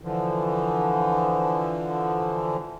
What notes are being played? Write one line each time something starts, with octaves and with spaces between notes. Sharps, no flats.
D3 E3 F3